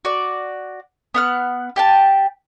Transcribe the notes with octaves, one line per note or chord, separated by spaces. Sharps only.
F#4 D5
B3 F#5 F6
G4 G5 A5